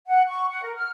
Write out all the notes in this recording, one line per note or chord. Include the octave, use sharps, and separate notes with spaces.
F#5
C#6
F#5
A#4
F6